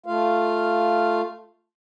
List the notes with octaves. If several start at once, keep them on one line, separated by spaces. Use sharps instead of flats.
A3 F4 F5